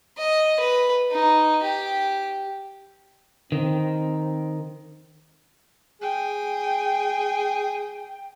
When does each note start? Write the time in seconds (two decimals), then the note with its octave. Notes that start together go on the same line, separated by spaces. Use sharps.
0.18 D#5
0.60 B4
1.11 D#4
1.63 G4
3.52 D#3 C4
6.02 G#4 G5